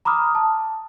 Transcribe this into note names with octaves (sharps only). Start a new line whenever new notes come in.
A#5 B5 D6 D#6 F6
A5